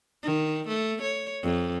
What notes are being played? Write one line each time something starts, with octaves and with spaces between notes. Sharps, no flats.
D#3
A3
C#5
F2